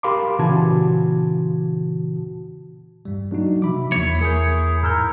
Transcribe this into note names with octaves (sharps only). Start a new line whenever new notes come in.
G4 A#4 F5 B5 C6 D6
A#2 C#3 E3 F#4 A5 G#6
G2 G3
F#3 A#3 D4 D#4 F#4
C3 F3 E5 B5 D6
E2 A#3 E4 C#5 E5
G#4 A#4 G6
G#2 A#4 E6 G6